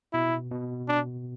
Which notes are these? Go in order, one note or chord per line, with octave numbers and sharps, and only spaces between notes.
B2 E4
B2
D4